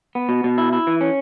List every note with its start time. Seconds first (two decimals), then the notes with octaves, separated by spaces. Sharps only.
0.15 B3
0.29 B2
0.44 B2
0.58 E4
0.73 E4
0.87 E3
1.01 C#4